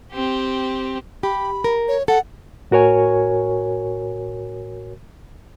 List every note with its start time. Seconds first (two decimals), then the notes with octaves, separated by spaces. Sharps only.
0.12 C4 G4
1.23 G4 B5
1.64 A#4
1.88 C#5
2.08 A4 F#5
2.71 A2 F#4 A#4 C#5 G#5